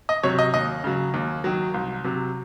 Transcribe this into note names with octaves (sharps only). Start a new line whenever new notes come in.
D#5
C3 F#3 C#5
D#5
D#2 D#5
C#3 F#3
D#2
D#3 F#3
C2
C3 F#3